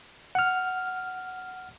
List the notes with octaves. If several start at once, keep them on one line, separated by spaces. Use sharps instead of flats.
F#5 F6